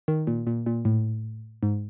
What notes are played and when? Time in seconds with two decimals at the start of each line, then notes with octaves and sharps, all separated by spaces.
0.08 D#3
0.27 A#2
0.47 A#2
0.66 A#2
0.85 A2
1.63 G#2